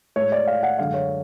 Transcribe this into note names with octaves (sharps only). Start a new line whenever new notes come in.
A2 G#3 C#5
D5
F5
F#5
F#2 D3 G#3 F5
C#5